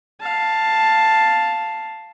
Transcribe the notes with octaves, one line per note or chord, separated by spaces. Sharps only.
F5 A5